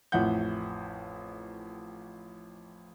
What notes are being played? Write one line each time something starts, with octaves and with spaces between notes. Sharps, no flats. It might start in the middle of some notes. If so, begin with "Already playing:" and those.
A1 F2 E4 F#5 G6